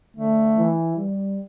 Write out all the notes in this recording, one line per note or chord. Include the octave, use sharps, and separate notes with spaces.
D3 A3
E3
G3